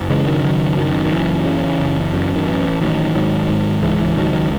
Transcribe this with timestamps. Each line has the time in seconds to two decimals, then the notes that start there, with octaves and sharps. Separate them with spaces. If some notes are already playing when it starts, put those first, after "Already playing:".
Already playing: F#1
0.10 C#3 E3 G#3
0.27 D#3 F#3
0.44 F#1 D#3 F#3
0.78 F#2 D#3
1.05 D#3
1.12 F#1 E3
1.45 C#3
1.80 F#1
2.14 F#2
2.36 D#3
2.47 A1 E3
2.81 A1 D#3 F#3
3.15 G#2 D#3 F#3
3.49 G#2
3.83 C#2 E3 G#3
4.00 E3
4.17 C#2 D#3 F#3
4.33 D#3 F#3